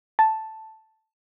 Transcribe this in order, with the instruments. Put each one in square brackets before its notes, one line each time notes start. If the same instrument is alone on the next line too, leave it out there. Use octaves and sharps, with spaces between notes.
[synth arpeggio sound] A5